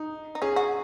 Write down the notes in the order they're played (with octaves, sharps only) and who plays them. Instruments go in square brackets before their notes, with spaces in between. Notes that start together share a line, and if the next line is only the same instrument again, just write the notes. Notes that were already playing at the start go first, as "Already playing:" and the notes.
Already playing: [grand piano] D#4
[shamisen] D#4
[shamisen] C#4 [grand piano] G#4
[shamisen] F#4